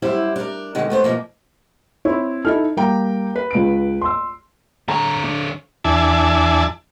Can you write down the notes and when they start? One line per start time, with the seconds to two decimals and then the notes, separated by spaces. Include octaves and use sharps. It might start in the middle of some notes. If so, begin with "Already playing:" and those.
0.02 F#2 G3 E4 C5
0.36 D4 A#4
0.75 B2 D3 D#3 G#3
0.90 A3 B3 C5
1.04 B2 F3 A#3
2.05 C4 E4 C#5
2.45 D#4 E4 A4 F6
2.77 G3 A#3 G5 A#5
3.36 B4
3.51 C#2 D7
4.02 C6 E6
4.88 D3 C#5 A#5
5.24 D4
5.85 E2 D4 E4 G#5 A5